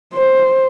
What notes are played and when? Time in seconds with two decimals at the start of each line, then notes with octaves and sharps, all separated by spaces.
0.14 C5